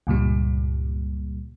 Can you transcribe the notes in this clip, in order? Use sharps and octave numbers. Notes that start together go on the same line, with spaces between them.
C#2 G2 A#2 G3